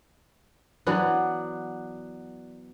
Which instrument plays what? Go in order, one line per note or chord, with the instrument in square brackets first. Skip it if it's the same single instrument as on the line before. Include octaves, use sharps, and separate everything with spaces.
[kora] E3 F#3 B3 D4